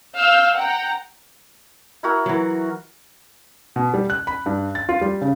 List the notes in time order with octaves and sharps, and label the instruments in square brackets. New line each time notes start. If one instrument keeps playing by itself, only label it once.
[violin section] F5 E6 G6
F#5 G5 A#5
[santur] E4 F#4 A#4
[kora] E3 F#3
[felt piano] B2
G3
F#6
B5
G2
A6
F4
G3
C#3